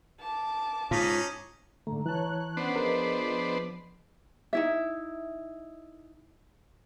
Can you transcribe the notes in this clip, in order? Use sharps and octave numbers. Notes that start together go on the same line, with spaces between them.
A5 D6
G#2 C#4 D#4 F4
G#2 D3 A3 A#5
E3 C#5 A5 F#6
B3 C#4 D4 C5 F#5
F3 G#4 A#4 B4 D#5
D#4 E4 E5